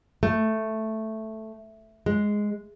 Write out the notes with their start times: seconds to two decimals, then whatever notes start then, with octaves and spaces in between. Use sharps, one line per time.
0.23 A3
2.06 G#3